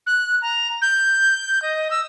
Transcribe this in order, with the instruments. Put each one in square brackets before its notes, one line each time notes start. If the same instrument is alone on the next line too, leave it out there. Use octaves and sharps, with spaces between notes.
[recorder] F#6
A#5
G6
D#5
E6